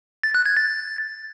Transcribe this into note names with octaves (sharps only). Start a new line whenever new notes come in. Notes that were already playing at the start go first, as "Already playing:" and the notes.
A6
F#6
G#6
A6